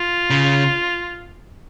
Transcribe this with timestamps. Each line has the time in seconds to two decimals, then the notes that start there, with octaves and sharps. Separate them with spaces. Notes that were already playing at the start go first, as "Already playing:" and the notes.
Already playing: F4
0.30 C#3